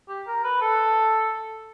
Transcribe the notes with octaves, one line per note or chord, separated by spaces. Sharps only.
G4
A#4
B4
A4